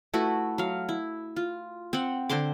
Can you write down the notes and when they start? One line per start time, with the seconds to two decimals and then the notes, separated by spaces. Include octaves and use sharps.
0.14 A3 E4 F#4 B4
0.58 F#3 F5
0.89 E4
1.36 F4
1.93 C4 F#5
2.29 D3 C5 C6 D6